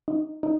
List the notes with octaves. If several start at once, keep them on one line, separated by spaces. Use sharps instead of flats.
D#4
D#4